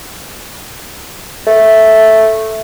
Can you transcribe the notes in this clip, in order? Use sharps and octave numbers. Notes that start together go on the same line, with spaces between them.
A3